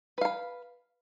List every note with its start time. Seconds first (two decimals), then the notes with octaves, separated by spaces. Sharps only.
0.18 B4
0.21 F5
0.25 B5